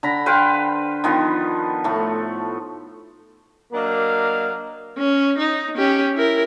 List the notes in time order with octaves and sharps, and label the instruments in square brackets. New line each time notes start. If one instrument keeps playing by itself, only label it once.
[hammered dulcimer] D3 A#5 B5
B4 C5 F5 G5
D#3 F3 B3
A2 A3
[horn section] F#3 A#3 D4 D#5 F5
[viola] C#4
D#4
C#4 G4
E4 A#4